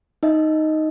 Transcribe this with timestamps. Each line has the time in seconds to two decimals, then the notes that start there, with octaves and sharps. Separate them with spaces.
0.23 D#4 D#5 E5